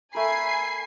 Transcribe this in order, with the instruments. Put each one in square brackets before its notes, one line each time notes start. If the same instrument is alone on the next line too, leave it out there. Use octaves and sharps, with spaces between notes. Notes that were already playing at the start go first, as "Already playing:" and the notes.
[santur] A3 A#4 [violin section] G#5 C7 [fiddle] B5